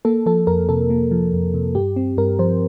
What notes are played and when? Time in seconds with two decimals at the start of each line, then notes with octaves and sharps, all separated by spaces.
0.05 A#3 A4
0.26 F3 A4
0.47 F2 A#4
0.69 C3 A4
0.90 A#3
1.11 F3
1.33 F2
1.54 C3
1.75 G2 G4
1.96 C4
2.18 G2 A#4
2.39 F3 C5